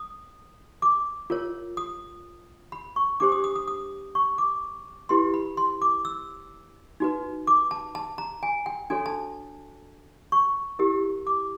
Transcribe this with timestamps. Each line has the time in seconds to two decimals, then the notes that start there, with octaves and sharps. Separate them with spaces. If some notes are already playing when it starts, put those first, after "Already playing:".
Already playing: D#6
0.82 D6
1.30 F4 A#4 C#5
1.77 D#6
2.72 B5
2.96 C#6
3.20 D4 G4 C5 D6
3.32 D#6
3.44 D#6
3.56 D#6
3.68 D#6
4.15 C#6
4.38 D6
5.09 E4 G4 B4 C6
5.34 B5
5.57 C6
5.82 D6
6.05 E6
7.00 D#4 F#4 B4
7.47 D6
7.71 A5
7.95 A5
8.18 A#5
8.43 G#5
8.66 G5
8.90 D4 F#4 A4 C#5 G#5
9.06 A5
10.32 C#6
10.79 E4 G4 A#4
11.27 D6